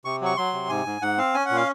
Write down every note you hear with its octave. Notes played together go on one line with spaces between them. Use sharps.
C3 C#6
F#3 C#6
F#3 C6
C3
G#2 G#5
G#2
G#2 F#5
C4 F5
C#4 G#5
F#5
A#2
F5